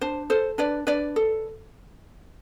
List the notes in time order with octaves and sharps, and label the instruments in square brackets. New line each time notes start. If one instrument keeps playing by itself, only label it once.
[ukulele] D4 C5
A4 C5
D4 B4 D5
D4 B4 D5
A4